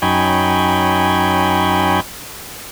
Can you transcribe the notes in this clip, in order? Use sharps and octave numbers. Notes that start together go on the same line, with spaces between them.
F#2 D#4 C#5 G5 G#5 B5